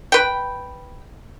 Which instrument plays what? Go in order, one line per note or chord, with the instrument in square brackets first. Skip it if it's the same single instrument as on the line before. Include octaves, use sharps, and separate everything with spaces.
[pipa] B4 G5